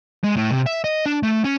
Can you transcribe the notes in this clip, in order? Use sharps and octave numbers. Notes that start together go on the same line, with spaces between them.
G#3
A2
C3
E5
D#5
D4
A3
C#4